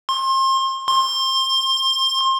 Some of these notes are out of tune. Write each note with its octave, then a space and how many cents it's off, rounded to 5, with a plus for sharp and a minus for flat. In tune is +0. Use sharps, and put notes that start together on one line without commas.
C6 +30
C6 +25